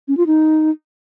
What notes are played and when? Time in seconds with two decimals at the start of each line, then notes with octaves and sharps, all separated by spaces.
0.08 C#4
0.17 F4
0.27 D#4